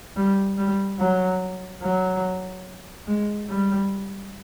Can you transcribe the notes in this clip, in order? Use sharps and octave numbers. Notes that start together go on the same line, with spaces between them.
G3
G3
F#3
F#3
G#3
G3